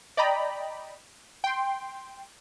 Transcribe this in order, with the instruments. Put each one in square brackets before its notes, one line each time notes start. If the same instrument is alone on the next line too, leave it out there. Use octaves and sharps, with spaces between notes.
[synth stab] D5 D#5 G5 A#5 B5
G5 C6